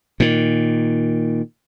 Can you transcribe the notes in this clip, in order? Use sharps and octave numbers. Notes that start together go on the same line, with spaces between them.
A#2 D#3